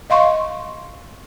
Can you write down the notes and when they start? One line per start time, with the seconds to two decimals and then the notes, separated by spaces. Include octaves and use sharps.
0.10 D#5 F5 C6 C#6